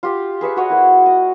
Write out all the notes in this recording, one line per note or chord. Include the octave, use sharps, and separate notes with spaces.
F4 G4 F5
G#4 B4 E5 C#6
F#4 C#5 D#5 F#5
A#3 E4
D#5